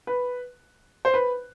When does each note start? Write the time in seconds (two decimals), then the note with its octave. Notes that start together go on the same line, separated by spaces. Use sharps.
0.07 B4
1.05 C5
1.14 B4